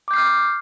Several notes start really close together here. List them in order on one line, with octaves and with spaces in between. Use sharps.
D6 G6 C7 F6